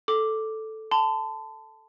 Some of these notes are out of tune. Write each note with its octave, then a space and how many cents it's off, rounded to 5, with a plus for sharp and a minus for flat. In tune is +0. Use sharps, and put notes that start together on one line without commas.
A4 +0 D6 +0
A5 +0 C6 -40